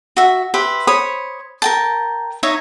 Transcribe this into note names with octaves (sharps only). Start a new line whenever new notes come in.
F#4 E5
G4 B4 C5 E5
C5 C#5 B5 D#6
A#4 G5 A5
D#4 C#5 E5 A#5